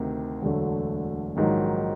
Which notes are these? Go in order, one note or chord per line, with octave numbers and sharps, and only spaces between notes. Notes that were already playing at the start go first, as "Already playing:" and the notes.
Already playing: D2 C3 D#3
E1 D2 D3 F#3 A3
A#1 G#2 D#3 F#3